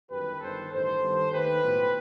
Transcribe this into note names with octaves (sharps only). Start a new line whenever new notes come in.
G1 F#2 D#3 G4 B4
G1 G2 D#3 A4 C5
A1 G2 D#3 A4 C5
G2 D#3 G3 B3
D#2 D#3 A3 G4 B4
B1 A2 F#3 B3